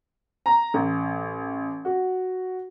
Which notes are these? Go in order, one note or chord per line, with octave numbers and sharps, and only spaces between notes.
A#5
A1
F#4